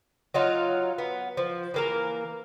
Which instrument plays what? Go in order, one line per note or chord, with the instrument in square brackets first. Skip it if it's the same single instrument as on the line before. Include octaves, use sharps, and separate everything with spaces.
[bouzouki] F#3 D#4 F4
B3
F3
E3 A#3 A#4